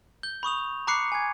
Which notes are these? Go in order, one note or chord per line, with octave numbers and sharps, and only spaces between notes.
G6 G7
B5 C#6 D#6 F7
A#5 B5 D6 F#6 C7 C#7
G#5 G#6